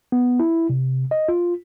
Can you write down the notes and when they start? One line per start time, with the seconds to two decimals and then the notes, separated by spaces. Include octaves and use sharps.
0.12 B3
0.40 E4
0.69 C3
1.11 D#5
1.28 F4